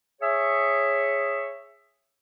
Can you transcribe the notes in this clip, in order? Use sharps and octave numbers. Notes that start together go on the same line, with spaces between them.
G#4 C#5 E5